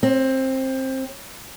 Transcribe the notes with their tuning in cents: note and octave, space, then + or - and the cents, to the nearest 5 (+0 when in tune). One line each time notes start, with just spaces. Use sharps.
C4 +15